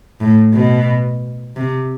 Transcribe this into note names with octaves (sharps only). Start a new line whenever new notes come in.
A2
B2
C3